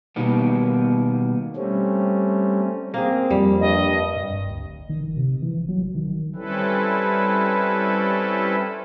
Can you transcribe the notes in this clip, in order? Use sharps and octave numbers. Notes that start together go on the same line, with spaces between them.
B2 D#3 G3 A#3 B3
G3 A3 C4 C#4
A#3 C4 G#4
F2 G3
G2 D#5
G2
G1
D2
G1
D#3
G1
C3
E3
G1
F#3
G#1
D#3
G3 C4 C#4 E4 A4 B4